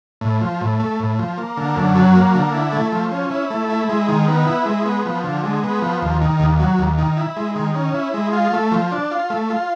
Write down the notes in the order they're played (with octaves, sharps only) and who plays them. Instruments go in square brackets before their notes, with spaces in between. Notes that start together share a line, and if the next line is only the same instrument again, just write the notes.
[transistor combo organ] A2
F3
A2
A3
A2
F3
A#3
D3
F#2
F#3
A#3
D3
E4
A3
F3
C#4
E4
A3
E4
G#3
D#3
B3
E4
G#3
B3
F3
D3
G#3
B3
F3
D#2
D#3
D#2
F#3
D#2
D#3
E4
G#3
D#3
C#4
E4
G#3
F4
A3
F3
D4
F4
A3
F4